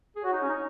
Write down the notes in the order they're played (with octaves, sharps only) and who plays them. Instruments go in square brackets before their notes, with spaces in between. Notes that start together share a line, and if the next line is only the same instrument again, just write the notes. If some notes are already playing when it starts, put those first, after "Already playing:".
[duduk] G#4
[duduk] F#4 [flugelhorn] C#5
[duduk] D#4
C#4
D#4